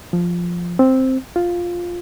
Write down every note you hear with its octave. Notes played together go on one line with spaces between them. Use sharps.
F3
C4
F4